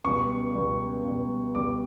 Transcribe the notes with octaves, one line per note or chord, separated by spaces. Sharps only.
C#2 B2 G3 C#6
C#2 B2 G3
C#2 B2 G3
C#2 B2 G3 D6